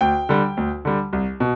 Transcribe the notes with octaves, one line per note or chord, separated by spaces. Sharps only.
D2 G5
D3 G3
D2
D3 G3
C2
B2